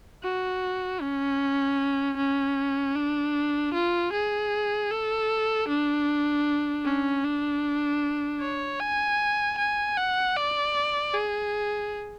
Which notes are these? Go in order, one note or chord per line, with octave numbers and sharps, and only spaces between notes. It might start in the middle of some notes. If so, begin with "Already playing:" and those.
F#4
C#4
C#4
D4
F4
G#4
A4
D4
C#4
D4
C#5
G#5
G#5
F#5
D5
G#4